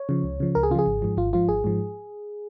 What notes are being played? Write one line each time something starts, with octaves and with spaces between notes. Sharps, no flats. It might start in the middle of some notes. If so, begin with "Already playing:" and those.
Already playing: C#5
C#3 F3
C#2
C#3 F3
C#2 A#4
G#4
C#3 F3 F4 G#4
G#1
G#2 F3
G#1 F4
G#2 F3 F4
G#1 G#4
G#2 F3